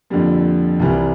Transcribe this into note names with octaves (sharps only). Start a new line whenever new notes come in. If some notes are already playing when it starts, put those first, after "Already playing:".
F2 D3 G3 A#3
C2 C3 E3 G3